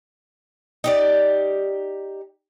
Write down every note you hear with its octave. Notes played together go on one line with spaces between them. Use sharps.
D#4 G4 D5